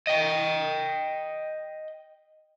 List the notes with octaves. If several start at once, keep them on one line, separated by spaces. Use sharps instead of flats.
D#5 G5